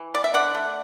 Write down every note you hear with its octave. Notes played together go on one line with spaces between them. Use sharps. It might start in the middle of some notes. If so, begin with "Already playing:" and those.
Already playing: E3
B3 D5
E5
D3 D5 F#5
A3